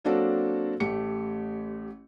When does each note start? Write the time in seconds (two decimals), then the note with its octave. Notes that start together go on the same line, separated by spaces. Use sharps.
0.05 F#3 A#3 C4 D4 F#4 A4
0.80 A1 A3 G4 C#7